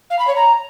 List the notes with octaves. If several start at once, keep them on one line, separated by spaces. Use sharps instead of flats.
F5
B5
C#5
A#5